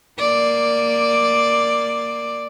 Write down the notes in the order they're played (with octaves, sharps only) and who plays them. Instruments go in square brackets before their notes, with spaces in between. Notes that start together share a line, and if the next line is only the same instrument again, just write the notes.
[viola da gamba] A#3 D5